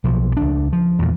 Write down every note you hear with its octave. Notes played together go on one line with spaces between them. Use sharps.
B1 F3
C#2 D4
F3
E2 A#2